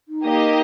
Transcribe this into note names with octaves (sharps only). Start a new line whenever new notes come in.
D#4
A#3 G4 D#5